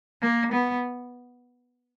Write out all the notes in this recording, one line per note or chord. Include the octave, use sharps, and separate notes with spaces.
A#3
B3